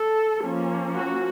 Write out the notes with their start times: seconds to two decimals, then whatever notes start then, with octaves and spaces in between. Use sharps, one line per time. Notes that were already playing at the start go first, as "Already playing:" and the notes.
Already playing: A4
0.43 F3 A#3 C#4
0.97 F#4